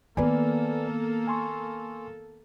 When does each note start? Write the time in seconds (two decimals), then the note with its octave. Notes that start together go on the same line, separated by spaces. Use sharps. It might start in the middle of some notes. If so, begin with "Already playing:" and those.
0.17 D#3 A#3 B3 A4 B4 D5 G#5
1.28 G#5 C6 C#6